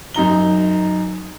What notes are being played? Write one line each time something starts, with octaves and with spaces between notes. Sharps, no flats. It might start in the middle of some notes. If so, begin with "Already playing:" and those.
F#2 D#4 A#5 G7